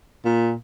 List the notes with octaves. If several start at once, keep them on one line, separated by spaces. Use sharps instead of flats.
A#2